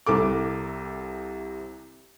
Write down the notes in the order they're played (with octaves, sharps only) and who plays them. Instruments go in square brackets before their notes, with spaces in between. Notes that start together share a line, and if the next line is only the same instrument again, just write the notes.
[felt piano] C2 C3 A4 D6